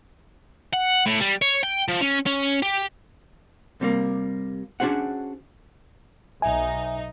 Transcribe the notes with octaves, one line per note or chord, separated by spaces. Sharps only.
F#5
A2
G3
C#5
G5
F3
C#4
C#4
G4
C3 G3 A#3
C#4 D4 F#4 G#4 C5 F#5
B1 D#4 E5 G#5